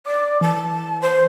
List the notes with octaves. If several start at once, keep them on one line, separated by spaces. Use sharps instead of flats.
D5 D6
E3 A5
C5